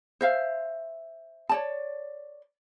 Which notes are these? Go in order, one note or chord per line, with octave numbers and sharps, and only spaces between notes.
C5 E5 F5
C#5 D5 A5